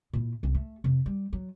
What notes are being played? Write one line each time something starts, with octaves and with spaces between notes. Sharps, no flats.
A#2 E4
C2 C4
A3
F2 C3
G3
F#3